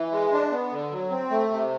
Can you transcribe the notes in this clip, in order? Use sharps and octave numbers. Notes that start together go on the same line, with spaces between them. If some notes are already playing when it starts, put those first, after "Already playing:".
Already playing: E3
G#3
D4
B3
D3
F#3
C4
A3
C3